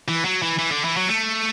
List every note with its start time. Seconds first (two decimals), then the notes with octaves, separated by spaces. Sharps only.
0.08 E3
0.25 F#3
0.42 E3
0.59 E3
0.71 D3
0.85 E3
0.97 F#3
1.09 A3